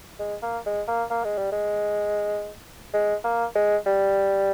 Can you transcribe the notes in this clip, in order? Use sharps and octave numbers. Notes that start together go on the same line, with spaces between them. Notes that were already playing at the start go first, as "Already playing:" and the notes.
G#3
A#3
G#3
A#3
A#3
G#3
G3
G#3
G#3
A#3
G#3
G3